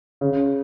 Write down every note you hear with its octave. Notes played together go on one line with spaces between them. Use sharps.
C#3